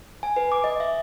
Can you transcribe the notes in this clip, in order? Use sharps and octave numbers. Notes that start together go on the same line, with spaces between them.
G#5
B4
D6
D#5
E5